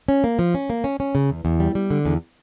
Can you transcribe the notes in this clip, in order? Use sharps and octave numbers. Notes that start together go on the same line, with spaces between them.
C#4
A#3
F3
C#4
A#3
C#4
C#4
C#3
E2
E2
G3
G3
D3
E2